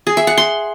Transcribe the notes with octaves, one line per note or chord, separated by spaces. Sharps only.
G#4
E5
F#5
C6